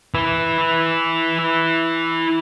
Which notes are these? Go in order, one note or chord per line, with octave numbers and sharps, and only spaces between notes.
E4 B4